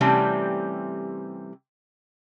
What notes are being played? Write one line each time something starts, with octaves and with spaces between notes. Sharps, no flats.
C3 E3 G3 A3 C4 C#4